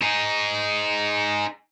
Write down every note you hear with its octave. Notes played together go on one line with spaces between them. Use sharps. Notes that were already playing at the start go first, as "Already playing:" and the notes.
D#4 G#4